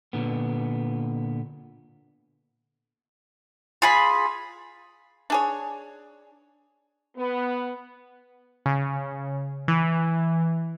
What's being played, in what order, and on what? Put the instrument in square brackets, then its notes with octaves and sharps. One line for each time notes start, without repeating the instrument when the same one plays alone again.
[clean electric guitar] A#2 D3 B3
[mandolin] F4 G#4 B5
[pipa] D4 G#4 C#5
[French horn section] B3
[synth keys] C#3
E3